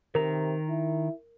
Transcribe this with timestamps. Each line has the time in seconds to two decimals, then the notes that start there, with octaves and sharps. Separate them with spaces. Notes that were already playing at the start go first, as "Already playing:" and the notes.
0.15 C3 D#3 A#4 A#5
0.69 E4